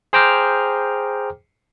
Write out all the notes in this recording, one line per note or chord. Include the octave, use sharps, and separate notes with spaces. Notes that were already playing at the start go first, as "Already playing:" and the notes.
G#4 C5 G5 A#5 D6 F6